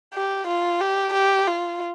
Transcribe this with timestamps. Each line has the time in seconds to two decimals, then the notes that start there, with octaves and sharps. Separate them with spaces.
0.14 G4
0.47 F4
0.81 G4
1.13 G4
1.47 F4